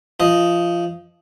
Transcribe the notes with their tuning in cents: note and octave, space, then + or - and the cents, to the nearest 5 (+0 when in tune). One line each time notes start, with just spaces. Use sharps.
F3 -20 D#5 +0